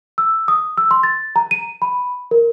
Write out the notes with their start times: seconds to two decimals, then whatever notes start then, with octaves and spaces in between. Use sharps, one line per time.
0.18 E6
0.48 D#6
0.78 E6
0.91 C6
1.03 A6
1.36 A#5
1.51 D#7
1.82 B5
2.31 A#4